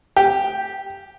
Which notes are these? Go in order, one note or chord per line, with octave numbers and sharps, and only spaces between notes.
G4